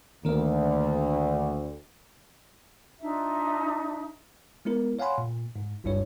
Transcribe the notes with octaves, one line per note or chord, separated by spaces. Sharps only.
D2 D#3 A#3
D4 D#4 F4 E5
G#3 B3 E4 A#4
C#5 F5 F#5 G#5 B5 C6
A#2
G#2
G1 C#2 G2 G3 E4 C#5